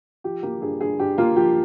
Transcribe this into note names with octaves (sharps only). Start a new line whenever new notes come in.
F3 G4
A#3 G4
G2 G#4
G2 G#4
G2 G4
A#3 F4
F3 G4